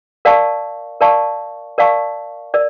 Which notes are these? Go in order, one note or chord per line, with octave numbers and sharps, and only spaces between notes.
A#4 D5 F5 A5 C#6
A#4 D5 F5 A5 C#6
A#4 D5 F5 A5 C#6
A#4 D5